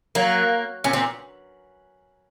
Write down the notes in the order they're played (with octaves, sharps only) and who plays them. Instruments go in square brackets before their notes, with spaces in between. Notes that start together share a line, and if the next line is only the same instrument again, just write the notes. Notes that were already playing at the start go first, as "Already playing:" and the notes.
[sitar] F#3 [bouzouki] A#3
[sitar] A#2 [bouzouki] C#4
[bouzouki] C4
[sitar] A#2